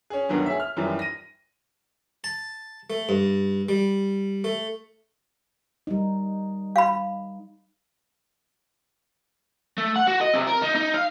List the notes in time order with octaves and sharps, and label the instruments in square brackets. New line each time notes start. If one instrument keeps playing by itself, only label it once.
[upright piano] C#4 G#4
D2 G2 D#3 F#3 B3
G#4 C#5 E5
F6
F#2 D#3 E3 G3
A#6 D#7
[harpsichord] A5
A3
G2
G3
A3
[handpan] G3 D#4
[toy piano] F5 B5
[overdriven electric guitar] A3
F#5
F#4
D#5
C3
A#4
D#4
D#4
F5